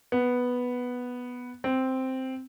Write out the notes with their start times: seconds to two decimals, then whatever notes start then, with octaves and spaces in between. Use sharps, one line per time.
0.12 B3
1.64 C4